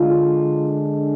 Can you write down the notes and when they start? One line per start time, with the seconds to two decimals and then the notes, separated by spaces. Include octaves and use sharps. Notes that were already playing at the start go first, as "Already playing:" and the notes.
Already playing: D3 G#3 D4 F4